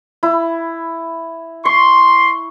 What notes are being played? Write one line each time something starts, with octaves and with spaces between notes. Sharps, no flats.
E4
C6 C#6